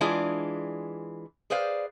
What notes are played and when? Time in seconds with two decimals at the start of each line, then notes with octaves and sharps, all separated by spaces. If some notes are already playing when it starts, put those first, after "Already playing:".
0.01 E3 G#3 D4 F4 G#4 D5
1.50 G#4 B4 C5 D5 F5